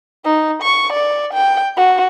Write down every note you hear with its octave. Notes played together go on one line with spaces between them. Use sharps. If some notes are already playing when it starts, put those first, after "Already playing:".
D#4
C#6
D5
G5
F#4